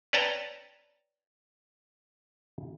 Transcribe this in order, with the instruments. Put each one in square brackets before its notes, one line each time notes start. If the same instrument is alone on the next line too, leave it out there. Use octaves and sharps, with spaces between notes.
[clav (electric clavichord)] B4 C#5 D5 G5 A5 A#5